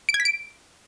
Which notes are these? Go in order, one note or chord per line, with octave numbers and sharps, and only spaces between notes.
D7
G#6
B6
D7